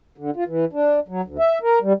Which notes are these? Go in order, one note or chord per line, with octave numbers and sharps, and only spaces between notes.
D3
F4
E3
D4
F#3
D2
E5
A#4
G3